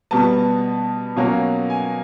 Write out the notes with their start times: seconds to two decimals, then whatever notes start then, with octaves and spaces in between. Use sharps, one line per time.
0.11 B2 G3 B3 A5
1.17 B2 F#3 A#3 C#4
1.70 G#5